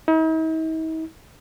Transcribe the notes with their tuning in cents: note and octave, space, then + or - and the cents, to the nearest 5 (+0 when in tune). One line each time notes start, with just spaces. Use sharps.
D#4 +45